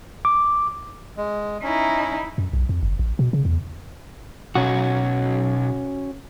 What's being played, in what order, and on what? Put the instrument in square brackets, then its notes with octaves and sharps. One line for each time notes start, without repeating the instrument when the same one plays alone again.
[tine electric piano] D6
[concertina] G#3
[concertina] C#4 [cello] D#4 E4
[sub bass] F#2
B1
F2
G1
A1
B2
C#3
E2
[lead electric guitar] B1 [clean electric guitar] C#4 F#4